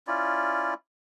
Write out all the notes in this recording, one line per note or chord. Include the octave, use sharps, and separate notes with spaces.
C#4 E4 F4 D5